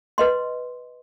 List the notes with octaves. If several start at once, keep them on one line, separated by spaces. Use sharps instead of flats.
B4 D#5 C6